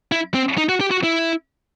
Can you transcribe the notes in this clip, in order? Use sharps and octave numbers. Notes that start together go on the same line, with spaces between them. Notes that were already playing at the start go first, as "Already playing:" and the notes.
E4
C4
D#4
F#4
G4
F#4
E4